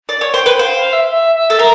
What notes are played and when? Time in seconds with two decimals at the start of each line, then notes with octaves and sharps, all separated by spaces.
0.09 D5
0.21 C#5
0.34 C5 G5
0.46 B4
0.59 C5 F5
0.75 F5
0.92 E5
1.09 E5
1.34 E5
1.50 A4
1.59 A#4 A#5